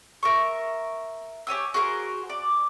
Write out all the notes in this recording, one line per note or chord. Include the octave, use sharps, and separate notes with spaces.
A#4 E5 C#6
G4 C#5 G#5 E6
F#4 G#4 A#4 C5
D5